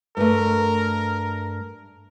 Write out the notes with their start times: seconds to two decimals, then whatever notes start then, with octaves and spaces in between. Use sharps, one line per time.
0.17 G2 A3 A#4